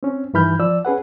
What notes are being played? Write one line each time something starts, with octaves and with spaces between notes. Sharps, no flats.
C4 C#4
G2 D#3 E3 B5 F6 G6
F3 D5 E6
C#4 G#4 B4 F#5